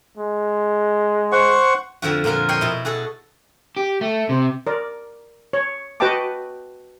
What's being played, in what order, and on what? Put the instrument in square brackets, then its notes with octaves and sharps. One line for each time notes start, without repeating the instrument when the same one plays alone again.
[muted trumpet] G#3
[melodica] C5 F#5 C#6
[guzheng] F2 D3 F3 F#4
A#2 D3 A#3 A#4 C6
A#4 C#5 D#5 G5 C6
B2 E4
F#4 G#4 A4
[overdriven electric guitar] G4
A3
C3
[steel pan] A#4 D5
C#5
F#4 B4 D#5 G5 A5 D6